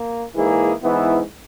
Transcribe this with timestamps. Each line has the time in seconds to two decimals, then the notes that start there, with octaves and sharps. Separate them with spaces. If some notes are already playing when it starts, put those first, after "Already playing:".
Already playing: A#3
0.34 G#2 E3 A#3 E4 G#4
0.82 G#2 E3 B3 E4